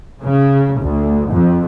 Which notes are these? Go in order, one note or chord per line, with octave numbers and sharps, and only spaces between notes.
C#3
D2
F2